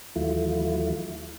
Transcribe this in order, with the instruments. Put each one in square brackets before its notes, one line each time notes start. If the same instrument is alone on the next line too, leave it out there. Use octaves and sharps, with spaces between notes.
[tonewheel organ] D#2 E3 F#3 A3 E4 F4